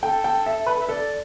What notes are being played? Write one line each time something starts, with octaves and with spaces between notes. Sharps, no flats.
A4 G5
G5
E5
B4
E5
A4 D5